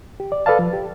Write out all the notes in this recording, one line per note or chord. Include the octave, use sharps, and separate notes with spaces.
G4
D5
A4 B4 D5 F5 A5
F3
G4